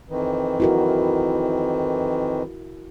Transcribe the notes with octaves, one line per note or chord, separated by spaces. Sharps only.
F2 D#3 E3
E4 F#4 A#4